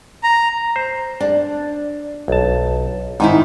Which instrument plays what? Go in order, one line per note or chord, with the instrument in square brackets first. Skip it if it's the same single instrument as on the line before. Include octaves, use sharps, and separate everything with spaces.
[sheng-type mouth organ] A#5
[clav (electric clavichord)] C5
[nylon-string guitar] D4
[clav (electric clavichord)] B1 A5
[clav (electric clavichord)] G#2 [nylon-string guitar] D#3 D#4 E4